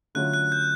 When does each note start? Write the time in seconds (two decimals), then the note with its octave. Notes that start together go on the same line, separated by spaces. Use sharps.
0.15 D3 F#3 A3 C#4 F4 F#6
0.34 F#6
0.52 G6